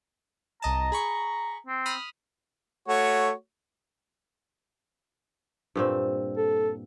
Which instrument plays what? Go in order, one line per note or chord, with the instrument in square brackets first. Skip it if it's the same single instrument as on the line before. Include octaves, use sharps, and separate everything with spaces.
[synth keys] C2 D#5 A5 [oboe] A#5
[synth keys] G#4 B5 C#6
[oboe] C4
[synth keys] B5 D#6 F6
[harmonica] A3 F#4 C#5
[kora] G2 A#2 C4
[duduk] A4